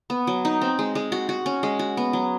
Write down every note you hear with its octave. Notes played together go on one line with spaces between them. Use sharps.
B3
F#3
D#4
C4
G#3
G#3
F#4
F#4
C#4
G#3
F#4
B3
F#3